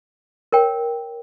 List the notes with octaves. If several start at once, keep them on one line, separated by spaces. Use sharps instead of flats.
A#4 C#5 G5